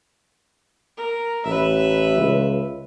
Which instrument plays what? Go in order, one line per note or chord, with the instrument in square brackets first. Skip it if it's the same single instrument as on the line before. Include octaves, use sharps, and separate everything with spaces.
[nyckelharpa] A#4
[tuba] A1 [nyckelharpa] B4 E5
[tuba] C#2